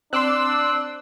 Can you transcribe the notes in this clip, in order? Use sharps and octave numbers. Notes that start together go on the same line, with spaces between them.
C4 D4 C6 D6 E6 F#6